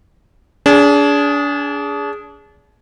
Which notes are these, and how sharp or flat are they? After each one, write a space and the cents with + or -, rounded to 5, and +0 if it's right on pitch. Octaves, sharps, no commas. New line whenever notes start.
D4 -35 G#4 +0